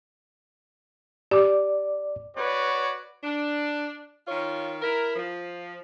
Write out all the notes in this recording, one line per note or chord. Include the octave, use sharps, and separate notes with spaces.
G4 D5 D6
F#4 B4 C#5 D5
D4
D#3 F4 C#5
E4 A#4
F3